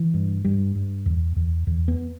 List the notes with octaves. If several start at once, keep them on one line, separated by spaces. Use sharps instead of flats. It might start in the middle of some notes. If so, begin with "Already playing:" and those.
Already playing: E3
G2
G2 G3
G2
E2
E2
E2
B3